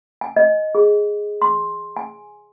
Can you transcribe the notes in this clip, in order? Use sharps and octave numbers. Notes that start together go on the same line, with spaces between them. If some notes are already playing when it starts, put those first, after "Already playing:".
G#5
D#5
G#4
C6
G#5